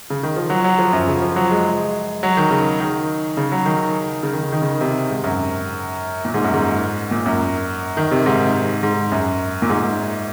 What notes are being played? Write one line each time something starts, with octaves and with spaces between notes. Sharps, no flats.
C#3
D#3
F3
F#3
F#3
F3
F#2
C#3
F3
F#3
G#3
F#3
D#3
C#3
D#3
C#3
F#3
D#3
C#3
D#3
C#3
D#3
C#3
C3
G#2
F#2
A#2
G#2
F#2
G#2
A#2
F#2
D#3
C3
G#2
G#2
F#2
A#2
G#2